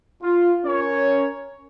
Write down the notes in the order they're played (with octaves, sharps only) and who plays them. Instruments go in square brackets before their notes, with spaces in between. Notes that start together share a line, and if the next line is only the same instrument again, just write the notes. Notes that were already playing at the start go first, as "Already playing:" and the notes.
[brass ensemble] F4
C#4 A#4 C#5